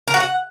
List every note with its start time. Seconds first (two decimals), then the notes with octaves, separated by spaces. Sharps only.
0.08 A#4
0.14 F#4
0.20 F#5